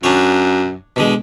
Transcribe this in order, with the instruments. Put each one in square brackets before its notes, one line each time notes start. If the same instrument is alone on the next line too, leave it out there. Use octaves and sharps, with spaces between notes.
[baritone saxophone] F#2 [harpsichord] D4 C#5
[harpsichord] B2 D3 G#3